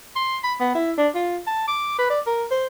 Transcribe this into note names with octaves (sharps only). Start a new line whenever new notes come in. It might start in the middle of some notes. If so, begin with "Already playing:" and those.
C6
B5
B3
E4
D4
F4
A5
D6
B4
D5
A#4
C5